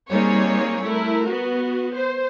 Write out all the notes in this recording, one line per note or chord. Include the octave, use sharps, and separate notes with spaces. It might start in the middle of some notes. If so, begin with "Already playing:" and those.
G3 A#3 C4 D#4 G#4 C#5
A3 E4 A#4
B3 F#4
C5